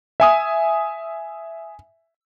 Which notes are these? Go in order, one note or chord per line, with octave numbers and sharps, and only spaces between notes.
E5 G#5 D#6